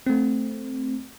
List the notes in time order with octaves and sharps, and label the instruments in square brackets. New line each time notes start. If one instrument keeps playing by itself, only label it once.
[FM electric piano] A3 C4